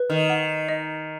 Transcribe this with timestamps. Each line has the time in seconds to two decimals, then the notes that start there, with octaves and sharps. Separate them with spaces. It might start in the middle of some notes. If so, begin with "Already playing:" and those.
Already playing: B4
0.10 D#3
0.30 F#5
0.69 D#5